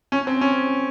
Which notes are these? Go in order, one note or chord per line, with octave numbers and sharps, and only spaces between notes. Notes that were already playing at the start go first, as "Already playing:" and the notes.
C#4
C4
C#4